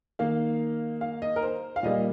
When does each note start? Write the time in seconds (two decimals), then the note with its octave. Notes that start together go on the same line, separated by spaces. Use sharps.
0.19 D#3 A#3 F5
1.01 F5
1.22 D#5
1.36 A#4
1.43 C5
1.76 F5
1.83 A#2 G3 A#3 D#5